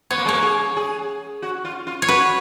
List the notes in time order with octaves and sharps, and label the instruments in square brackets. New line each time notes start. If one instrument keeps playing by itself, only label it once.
[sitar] B3 [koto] C#5
[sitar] A#3
G#3
[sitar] A#3 [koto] C#5
[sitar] G#4
G#4
F#4
F4
F4
[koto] C#5
[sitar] F#4 [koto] B4